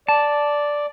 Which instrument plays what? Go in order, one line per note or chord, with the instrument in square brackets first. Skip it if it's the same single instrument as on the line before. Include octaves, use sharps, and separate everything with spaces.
[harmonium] D5 [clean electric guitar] A5